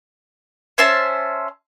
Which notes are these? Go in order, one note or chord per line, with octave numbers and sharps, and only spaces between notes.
C#4 C5 E5 A5